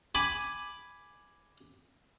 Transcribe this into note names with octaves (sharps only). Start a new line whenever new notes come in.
G#5 B5 D6